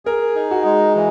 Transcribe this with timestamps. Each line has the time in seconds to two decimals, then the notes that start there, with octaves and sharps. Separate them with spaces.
0.05 G#4 A#4
0.36 D#4
0.51 F#4
0.65 G#3
0.95 E3